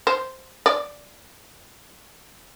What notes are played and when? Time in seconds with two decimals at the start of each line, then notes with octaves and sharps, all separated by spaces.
0.07 C5
0.66 D5